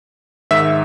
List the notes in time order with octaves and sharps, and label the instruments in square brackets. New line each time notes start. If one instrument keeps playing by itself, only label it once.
[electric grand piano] G#2 D#3 E5